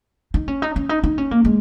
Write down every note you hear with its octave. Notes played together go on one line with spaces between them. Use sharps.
D#4
C#4
D#4
C#4
D#4
D#4
C#4
A#3
G#3